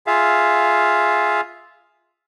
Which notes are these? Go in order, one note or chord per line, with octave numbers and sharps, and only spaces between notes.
F4 G#4 E5 F5